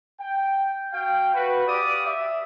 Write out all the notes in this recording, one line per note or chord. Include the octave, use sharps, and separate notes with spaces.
G5
F#4 F5 G5
F#4 B4
G4 D5 F5 D6 D#6
E5